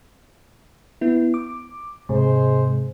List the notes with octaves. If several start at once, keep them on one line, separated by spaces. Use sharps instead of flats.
B3 E4
D6
G#2 C3 G#3 C5